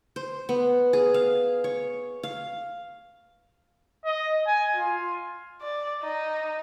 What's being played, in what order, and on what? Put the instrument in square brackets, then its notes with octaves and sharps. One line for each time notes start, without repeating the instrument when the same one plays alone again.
[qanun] C5
B3
G#4
F5
C#5
F5
[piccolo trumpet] D#5
G#5
F4
[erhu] D5
D#4